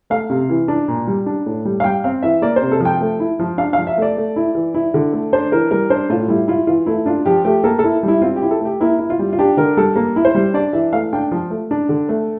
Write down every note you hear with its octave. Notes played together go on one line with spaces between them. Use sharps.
A3 F5
C3
E3
D4
A#2
G3
D4
A2
G3
F5
G3 G5
C4 F5
E3 E5
A#3 D5
C5
C3
A4
F3 G5
A3
E4
F3
D4 F5
F3 F5
E5
A3 D5
A3
E4
E3
E4
D3
A3
D4 C5
E3 A#4
G3 A#4
D4 C5
A2 F4
G3 E4
E4 F4
E3 F4
A3 E4
D4 F4
F3 G4
A3 G4
A#3 A4
A4
E4
G3 E4
C4 F4
G4
E4
A4
A3 G4
A#3 E4
E4
F4
G3
F4
D4 G4
D3 A#4
G3 A4
A#3
E4
C5
G3
D4 D5
E3 E5
A3 F5
D4 G5
F3
A3
D4
D3
A3